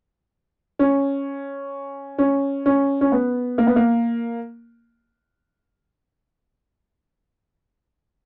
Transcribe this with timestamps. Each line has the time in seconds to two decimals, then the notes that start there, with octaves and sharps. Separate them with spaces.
0.79 C#4
2.18 C#4
2.66 C#4
3.01 C#4
3.12 B3
3.58 A#3
3.67 B3
3.76 A#3